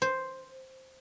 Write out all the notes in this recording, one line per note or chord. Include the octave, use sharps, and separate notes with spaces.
C5